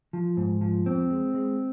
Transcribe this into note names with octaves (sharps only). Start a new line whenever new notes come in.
F3
G#2
F3
F2 C4
G#3
G#3